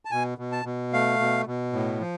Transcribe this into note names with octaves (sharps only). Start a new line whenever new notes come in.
A5
B2 G#5
B2
A5
B2
A3 F5
B2
B2
A2
F3